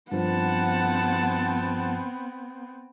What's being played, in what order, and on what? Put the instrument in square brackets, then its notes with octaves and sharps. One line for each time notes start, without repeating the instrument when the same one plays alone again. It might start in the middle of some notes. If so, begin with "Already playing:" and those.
[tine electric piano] G2 F3 [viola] B3 C4 [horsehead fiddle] F#5 A5